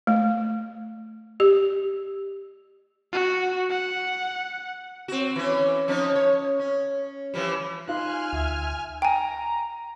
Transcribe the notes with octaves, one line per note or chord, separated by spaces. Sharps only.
A3
G4
F#4
F#5
C4 F#4
E3 C#4
F3 C#4 D#4
C#5
C#4
E3 F3 G3
D#4 F4 G#5 C6 F6 F#6
D2 E5
G5 G#5 A#5